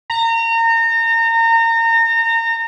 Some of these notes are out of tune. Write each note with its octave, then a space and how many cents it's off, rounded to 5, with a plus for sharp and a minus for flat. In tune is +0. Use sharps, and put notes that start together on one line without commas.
A#5 -30